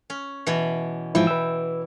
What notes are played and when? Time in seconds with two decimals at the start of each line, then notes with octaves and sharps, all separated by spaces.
0.10 C#4
0.47 B2 E3
1.15 G#2 E3 F3 E4 G5
1.27 B4 E6